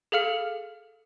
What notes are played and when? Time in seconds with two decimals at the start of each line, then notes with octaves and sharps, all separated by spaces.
0.12 G#4 A4 F5 F6 C#7